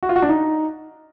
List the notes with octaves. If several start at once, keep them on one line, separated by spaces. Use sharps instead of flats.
F#4
F4
F#4
D4
D#4